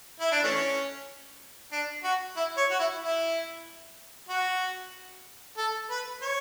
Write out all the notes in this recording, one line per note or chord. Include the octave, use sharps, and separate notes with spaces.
E4
D4
E3 A3 C#4
D4
F#4
E4
C#5
F#4
E4
E4
F#4
A4
B4
C#5